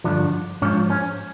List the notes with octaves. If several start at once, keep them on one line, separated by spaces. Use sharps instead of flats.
G2 D3 F3 D4
G#2 F3 C#4
C#4